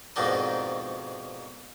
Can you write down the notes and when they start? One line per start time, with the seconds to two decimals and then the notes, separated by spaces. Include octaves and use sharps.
0.16 F2 G#2 B2 D#3 D4 D#4